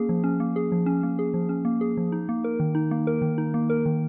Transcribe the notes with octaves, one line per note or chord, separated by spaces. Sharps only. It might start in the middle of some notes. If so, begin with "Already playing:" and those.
Already playing: A#3 C#4 G#4
F3
C#4
A#3
G#4
F3
C#4
A#3
G#4
F3
C#4
A#3
G#4
F3
D#4
A#3
A#4
D#3
D#4
A#3
A#4
D#3
D#4
A#3
A#4
D#3